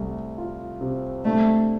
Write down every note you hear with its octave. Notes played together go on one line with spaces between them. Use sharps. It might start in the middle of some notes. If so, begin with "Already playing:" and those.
Already playing: C2 A3
F4
C3
A3 D4